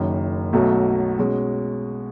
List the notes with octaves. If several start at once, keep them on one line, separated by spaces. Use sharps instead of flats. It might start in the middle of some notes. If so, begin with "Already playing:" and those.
Already playing: F#1 F#2 D#3
B1 B2 F#3 A3
B2 G#3 C#4